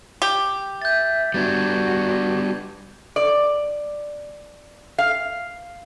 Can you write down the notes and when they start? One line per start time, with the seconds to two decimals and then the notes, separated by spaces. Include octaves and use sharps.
0.22 G4
0.82 E5 G6 A6
1.34 G3 B3 D4 F#4 G#6 A6
3.16 D5
4.98 F5